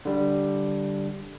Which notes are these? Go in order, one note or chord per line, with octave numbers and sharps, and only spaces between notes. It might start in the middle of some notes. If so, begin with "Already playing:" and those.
D3 G3